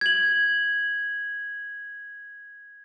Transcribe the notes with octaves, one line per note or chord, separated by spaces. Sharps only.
G#6 F#7